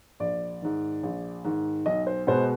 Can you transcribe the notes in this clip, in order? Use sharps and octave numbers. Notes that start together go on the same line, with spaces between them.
A#1 D5
G#2 D#3
A#1
G#2 D#3
B1 D#5
C5
B2 G#3 B3 C5